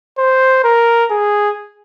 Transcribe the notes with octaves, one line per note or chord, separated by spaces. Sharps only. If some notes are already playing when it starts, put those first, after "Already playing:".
C5
A#4
G#4